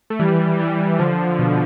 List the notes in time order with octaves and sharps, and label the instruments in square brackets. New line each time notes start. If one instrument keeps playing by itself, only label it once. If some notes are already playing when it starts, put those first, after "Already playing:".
[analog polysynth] A3
E3 G3
E3 G3
D3 F3
B2